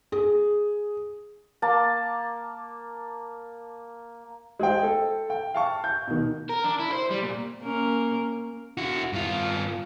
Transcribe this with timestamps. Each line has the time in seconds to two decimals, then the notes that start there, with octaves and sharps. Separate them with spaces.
0.12 G#4
1.62 A#3 A5
4.59 G#3 G#4 C5 G5
4.83 A4
5.30 G5
5.54 F5 A5 C#6
5.84 G6
6.08 B2 D#3
6.49 A#4
6.64 D4
6.79 E4
6.92 C5
7.10 G3
7.23 A#2
7.61 A#3 C#4 A#4
8.77 E4 F#4
9.13 G2 F4